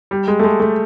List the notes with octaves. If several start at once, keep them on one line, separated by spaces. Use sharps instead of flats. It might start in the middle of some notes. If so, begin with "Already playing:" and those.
G3
G#3
A3
G#3
A3